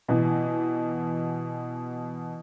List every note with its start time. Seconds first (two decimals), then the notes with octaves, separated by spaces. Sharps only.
0.08 B2 E3